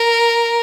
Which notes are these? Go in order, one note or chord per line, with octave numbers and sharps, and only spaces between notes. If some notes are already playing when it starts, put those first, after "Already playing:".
Already playing: A#4